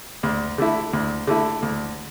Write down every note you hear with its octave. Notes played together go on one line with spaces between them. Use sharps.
D2
D3 A3 E4
D2
D3 A3 E4
D2